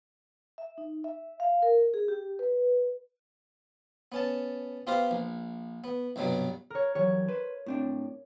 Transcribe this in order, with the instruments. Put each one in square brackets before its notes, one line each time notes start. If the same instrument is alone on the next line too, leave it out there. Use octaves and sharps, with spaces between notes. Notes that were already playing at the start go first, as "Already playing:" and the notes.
[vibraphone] E5
D#4
E5
F5
A#4
G#4
G4
B4
[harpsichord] B3 C#4 A5
B3 F4 G4 C5 F5
A#1
B3
C2 G2 B2 F#3 G3
[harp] A#4 C#5
[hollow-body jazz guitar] E3 F#3 G3 [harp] C#5
[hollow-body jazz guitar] B4 C5
A2 C4 D4